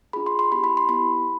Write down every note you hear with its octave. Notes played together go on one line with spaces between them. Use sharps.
D4 F4 G#4 B5
C6
C6
B3 E4 G4 B5
B5
C6
B3 E4 G4 B5